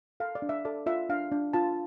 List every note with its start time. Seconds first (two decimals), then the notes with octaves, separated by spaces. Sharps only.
0.20 A4 F5
0.35 D5
0.42 D4
0.49 E5
0.65 A4 D5
0.86 F4 E5
1.09 D4 F5
1.32 D4
1.53 F4 A5